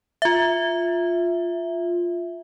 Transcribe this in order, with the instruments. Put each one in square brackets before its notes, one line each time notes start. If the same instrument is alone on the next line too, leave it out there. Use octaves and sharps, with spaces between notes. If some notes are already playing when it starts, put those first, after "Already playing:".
[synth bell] F4 E5